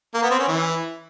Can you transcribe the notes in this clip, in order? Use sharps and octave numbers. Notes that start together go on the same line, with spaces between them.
A#3
B3
C4
C#4
E3